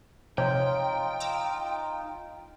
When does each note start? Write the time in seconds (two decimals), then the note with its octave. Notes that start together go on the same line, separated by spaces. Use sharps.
0.38 C3 F3 D#4 F4 C#5 G5
1.20 A#5 D6 E6